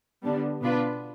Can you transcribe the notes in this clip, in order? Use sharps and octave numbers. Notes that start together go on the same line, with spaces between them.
D3 G3 B3 D4
B2 B3 D4 F4 B4